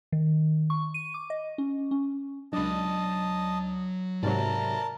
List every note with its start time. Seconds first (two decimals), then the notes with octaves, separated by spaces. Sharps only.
0.12 D#3
0.70 C#6
0.94 D#7
1.14 D6
1.30 D#5
1.58 C#4
1.91 C#4
2.53 C#2 F#3 D4 D#5 A5 B5
4.23 G#2 C3 F#3 A#4 D5 E5 A5